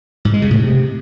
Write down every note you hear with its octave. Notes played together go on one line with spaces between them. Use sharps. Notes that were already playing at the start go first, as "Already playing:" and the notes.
G#2
G#3
C#3
A2
C3